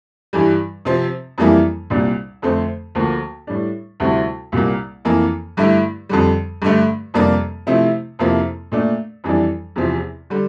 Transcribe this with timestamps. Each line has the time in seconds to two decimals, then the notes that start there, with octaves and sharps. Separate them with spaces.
0.33 G2 E3 G3
0.85 C3 F3 C4
1.38 F2 E3 G3 A#3 E4
1.90 C2 A#2 G3 D4
2.42 F2 D3 A3 C4
2.95 D2 D3 F3 A#3
3.47 A2 G3 D4
4.00 D2 C3 G3 C4 E4
4.52 C2 A#2 G3 A#3
5.05 F2 E3 A#3
5.57 G2 D3 A3 E4
6.09 F2 D3 G3
6.62 G2 D3 A3
7.14 F2 C3 G3 A#3 D4
7.67 C3 F3 A3 C4 E4
8.19 F2 C3 F3 A#3 E4
8.72 A#2 A3 D4
9.24 F2 E3 G3 D4
9.76 E2 C3 F3
10.30 D3 G3